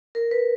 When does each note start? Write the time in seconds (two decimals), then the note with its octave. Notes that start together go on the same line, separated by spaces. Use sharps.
0.15 A#4
0.31 B4